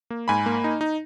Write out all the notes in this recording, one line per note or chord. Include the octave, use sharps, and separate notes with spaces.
A#3
G#2 G#5 B5
A#3
D#4
D#4